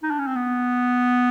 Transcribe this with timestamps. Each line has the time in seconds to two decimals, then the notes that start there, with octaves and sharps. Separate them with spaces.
0.03 D#4
0.11 D4
0.19 C#4
0.27 C4
0.36 B3